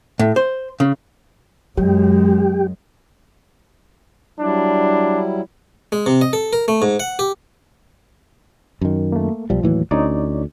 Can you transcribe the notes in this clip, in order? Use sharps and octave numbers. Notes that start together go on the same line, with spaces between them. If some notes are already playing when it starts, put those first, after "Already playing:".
A2
C5
C#3
F#2 F#3 G#3 G4
F#3 G3 D4 E4
G#3
C3
D#5
A4
A#4
A3
G#2
F#5
G4
F#2 D#3
A3 A#3
B1 F3 G3
D#2 A2 E3 F#3
D2 C#4 D#4 C#5 D5